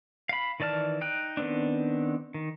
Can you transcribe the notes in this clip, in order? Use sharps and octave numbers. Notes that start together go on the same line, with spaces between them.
F5 B5
D#3 E3 D5 A5 F6
D#4 G5 F#6
D#3 B3 C4 D4
D#3